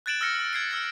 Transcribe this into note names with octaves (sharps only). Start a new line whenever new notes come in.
F#6 G#6 A6 D7 E7 F#7
E6 F6 A#6 C#7
G#6 C7 D7
E6 F6 A6 C#7